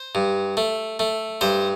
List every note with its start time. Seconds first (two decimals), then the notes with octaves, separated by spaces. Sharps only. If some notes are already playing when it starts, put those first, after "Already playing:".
Already playing: C5
0.15 G2
0.57 A3
0.99 A3
1.41 G2 C5